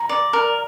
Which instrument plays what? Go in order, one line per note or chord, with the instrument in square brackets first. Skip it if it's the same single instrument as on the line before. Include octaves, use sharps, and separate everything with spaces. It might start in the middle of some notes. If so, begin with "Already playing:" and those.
Already playing: [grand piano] A#5
[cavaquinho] D5
A#4